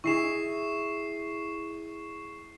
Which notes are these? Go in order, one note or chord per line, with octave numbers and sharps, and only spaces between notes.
E4 G#4 C#6 C7 E7